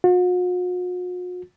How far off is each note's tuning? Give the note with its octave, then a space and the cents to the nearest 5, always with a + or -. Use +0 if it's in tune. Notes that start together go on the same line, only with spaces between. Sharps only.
F#4 -45